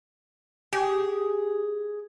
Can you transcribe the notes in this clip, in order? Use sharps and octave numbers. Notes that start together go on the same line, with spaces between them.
G4 G#4